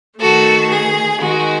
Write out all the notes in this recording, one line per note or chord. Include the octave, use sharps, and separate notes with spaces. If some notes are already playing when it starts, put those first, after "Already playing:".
D#3 A3 F#4 A4
G#4
D#3 G#3 F#4